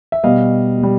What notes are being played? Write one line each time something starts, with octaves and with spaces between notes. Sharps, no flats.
E5
B2 G3 D#5 F5
B2
G3